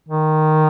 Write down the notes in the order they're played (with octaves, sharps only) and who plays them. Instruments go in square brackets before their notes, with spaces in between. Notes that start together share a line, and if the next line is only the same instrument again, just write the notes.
[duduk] D#3